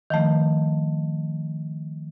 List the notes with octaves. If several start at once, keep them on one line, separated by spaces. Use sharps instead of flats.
D#3 F3 A3